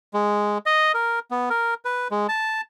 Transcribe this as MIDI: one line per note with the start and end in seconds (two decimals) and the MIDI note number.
0.14 0.58 56
0.66 0.92 75
0.94 1.19 70
1.31 1.49 59
1.50 1.74 70
1.85 2.08 71
2.11 2.27 56
2.29 2.61 81